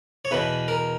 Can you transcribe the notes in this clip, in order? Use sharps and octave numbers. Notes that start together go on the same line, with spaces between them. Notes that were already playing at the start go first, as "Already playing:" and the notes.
C#5
E2 B2 B4
A#4